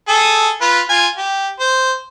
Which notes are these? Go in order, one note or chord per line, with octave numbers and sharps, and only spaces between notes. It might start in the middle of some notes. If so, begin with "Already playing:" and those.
G#4 A4
F4 B4
F4 G#5
G4
C5